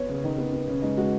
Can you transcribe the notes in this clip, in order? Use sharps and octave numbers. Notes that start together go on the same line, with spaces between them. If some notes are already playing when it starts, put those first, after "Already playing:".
Already playing: B3 C#5
C#3 C#4
D#3 D#4
B3
B3
C#3 C#4
G#3 D#4
G#3 F#4